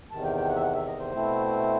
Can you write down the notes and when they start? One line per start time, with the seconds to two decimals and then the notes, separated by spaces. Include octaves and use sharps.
0.11 E2 C3 D#3 A5
0.24 G5
0.37 G5
0.49 F#5
0.56 E5
0.62 F#5
0.74 E5
0.87 D#5
0.99 C5
1.12 B2 A3 C4 E4